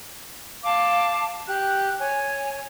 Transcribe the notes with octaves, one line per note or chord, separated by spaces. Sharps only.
F5 A5 D6
G4 F#6
C#5 G#5